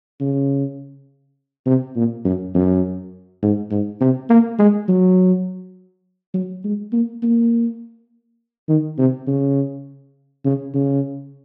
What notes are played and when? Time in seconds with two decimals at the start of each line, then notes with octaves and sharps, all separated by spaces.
0.20 C#3
1.66 C3
1.96 A#2
2.25 F#2
2.54 F#2
3.42 G#2
3.70 G#2
4.01 C3
4.29 A#3
4.58 G#3
4.88 F#3
6.34 F#3
6.64 G#3
6.92 A#3
7.22 A#3
8.68 D#3
8.98 C3
9.27 C#3
10.45 C#3
10.74 C#3